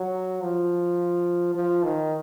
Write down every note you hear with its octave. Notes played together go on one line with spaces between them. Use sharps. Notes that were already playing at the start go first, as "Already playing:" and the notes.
Already playing: F#3
F3
F3
D#3